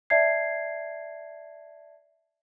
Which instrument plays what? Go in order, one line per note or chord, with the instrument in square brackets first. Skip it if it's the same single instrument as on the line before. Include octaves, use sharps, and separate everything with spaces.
[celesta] D5 E5 A5 G#6 C7